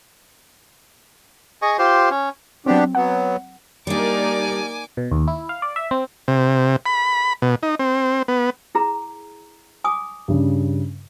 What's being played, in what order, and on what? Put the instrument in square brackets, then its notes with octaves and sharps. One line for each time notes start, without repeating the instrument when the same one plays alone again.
[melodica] G#4 D#5 G#5 C#6
F4 G4 C5 C6
C#4
[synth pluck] F#3 C4 [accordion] B3 D4 G4
[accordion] F#3 B3 [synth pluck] F#5
[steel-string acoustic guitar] G3 D4 [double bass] A#3 [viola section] D#4 A#4 D5 [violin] G#5 D6
[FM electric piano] B2
D#2
E4
F5
D5
E5
C4
[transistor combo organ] C3
B5
B2
D#4
C4
B3
[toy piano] E4 G#4 A#5
G#5 D6 D#6
[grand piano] G2 C#3